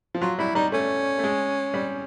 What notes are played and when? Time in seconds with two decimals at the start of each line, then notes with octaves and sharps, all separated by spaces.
0.14 F3
0.21 F#3 F4
0.39 G3 E4
0.55 G3 D#4
0.72 A3 C#4
1.18 A3
1.24 G#3
1.74 G3